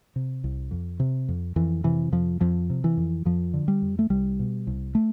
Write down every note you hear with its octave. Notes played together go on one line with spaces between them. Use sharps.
C3
C2
F2
C3
F2
F2 E3
C3 E3
F2 F3
F2 F3
C3
E3
F2
F2 F3
D3
G3
F2
A3
C2 G3
B2
C2
A3